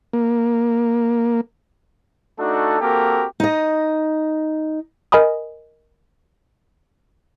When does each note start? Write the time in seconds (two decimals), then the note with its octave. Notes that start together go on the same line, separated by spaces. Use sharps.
0.13 A#3
2.39 A3 D4 D#4 F#4 A4
2.80 A#3 C4 F#4 G4 A4 A#4
3.40 D#4 D#5
5.12 A#4 D#5 G#5 B5 D#6